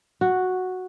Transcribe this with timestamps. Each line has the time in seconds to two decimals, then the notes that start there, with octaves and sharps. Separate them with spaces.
0.21 F#4